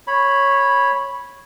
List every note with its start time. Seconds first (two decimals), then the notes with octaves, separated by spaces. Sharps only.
0.07 C#5 B5